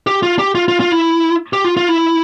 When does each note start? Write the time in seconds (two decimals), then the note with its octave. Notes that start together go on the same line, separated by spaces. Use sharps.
0.07 G4
0.23 F4
0.39 G4
0.55 F4
0.68 F4
0.80 F4
0.92 E4
1.53 G4
1.64 F4
1.77 F4
1.89 E4